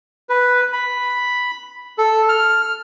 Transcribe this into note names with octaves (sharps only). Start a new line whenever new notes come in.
B4
B5
A4
F6